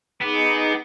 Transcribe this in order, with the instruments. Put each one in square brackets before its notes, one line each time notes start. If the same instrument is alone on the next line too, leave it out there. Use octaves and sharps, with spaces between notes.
[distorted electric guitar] B3 [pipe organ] D#4 G#4 D6